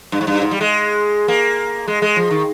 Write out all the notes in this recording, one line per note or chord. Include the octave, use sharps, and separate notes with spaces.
G2
G#2
G2
G#2
G3
G#3
A#3
G#3
G#3
F3
D#3